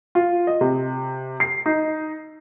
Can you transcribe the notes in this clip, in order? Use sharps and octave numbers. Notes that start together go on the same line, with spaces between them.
F4
D#5
C3
C7
D#4